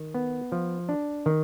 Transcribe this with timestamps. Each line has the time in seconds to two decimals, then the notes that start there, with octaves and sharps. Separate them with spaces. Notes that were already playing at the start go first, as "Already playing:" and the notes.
Already playing: D#3
0.14 B3
0.52 F3
0.89 D4
1.26 D#3